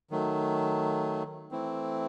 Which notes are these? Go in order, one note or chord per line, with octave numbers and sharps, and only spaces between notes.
D#3 F#3 A3
E3 A3 C4 E4